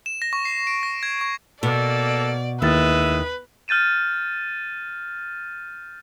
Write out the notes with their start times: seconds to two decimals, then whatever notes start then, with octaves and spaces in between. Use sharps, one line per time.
0.06 E7
0.22 A#6
0.33 C#6
0.45 C7
0.67 D7
0.83 A#6
1.03 G#6
1.21 C#6
1.63 B2 A#3 A4 D5
2.62 D#2 D#3 G#3 E4 B4 E5 D#6 A6
3.68 F6 G6 A6 D#7 E7